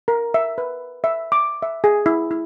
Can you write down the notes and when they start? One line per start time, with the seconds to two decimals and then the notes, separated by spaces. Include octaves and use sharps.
0.08 A#4
0.34 E5
0.58 B4
1.04 E5
1.32 D6
1.62 E5
1.84 G#4
2.06 E4
2.31 E4